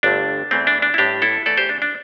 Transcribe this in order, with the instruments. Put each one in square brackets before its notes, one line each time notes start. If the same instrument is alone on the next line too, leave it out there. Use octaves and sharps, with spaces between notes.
[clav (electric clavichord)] G1 G2 D3 A3 D4
E2 E3 A3 C4
D4
D4
E4
A1 A2 G3 D4 G4
E4 A4
E2 E3 A3 A4 D5
G4 C5
D4
D4